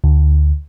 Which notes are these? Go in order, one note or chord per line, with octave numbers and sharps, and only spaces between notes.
D2